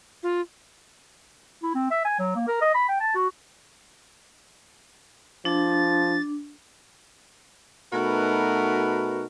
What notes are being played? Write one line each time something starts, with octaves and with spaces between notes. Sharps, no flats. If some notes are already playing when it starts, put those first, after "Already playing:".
F4
E4
C4
E5
G#5
F#3
A#3
A#4
D#5
B5
G5
A5
F#4
F3 D4 A6
B2 A3 D#4 F#4 A#4 B4